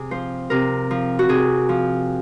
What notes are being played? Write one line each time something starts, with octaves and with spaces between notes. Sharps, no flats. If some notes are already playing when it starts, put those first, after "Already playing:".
Already playing: C3 G#4
F3 C5
C3 A#4
F3
F#4
C3 G#4
F3